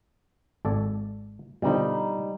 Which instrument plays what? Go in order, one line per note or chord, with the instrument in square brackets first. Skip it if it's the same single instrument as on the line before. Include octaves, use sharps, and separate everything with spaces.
[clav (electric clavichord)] G#1 A4 D5
[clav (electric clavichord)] B2 D3 F3 [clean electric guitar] G3 D#4